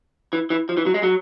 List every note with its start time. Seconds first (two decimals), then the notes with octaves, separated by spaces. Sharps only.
0.33 E3
0.50 E3
0.69 F3
0.77 E3
0.86 F#3
0.94 G#3
1.03 F#3